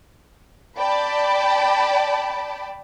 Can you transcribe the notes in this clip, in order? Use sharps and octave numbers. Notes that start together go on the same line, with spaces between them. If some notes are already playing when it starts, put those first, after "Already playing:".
D5 G5 A5 B5